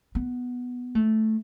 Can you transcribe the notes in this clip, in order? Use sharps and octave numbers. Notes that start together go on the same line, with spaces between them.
B3
A3